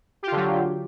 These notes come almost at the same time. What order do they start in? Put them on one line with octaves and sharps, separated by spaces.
G4 F4 D3 F#3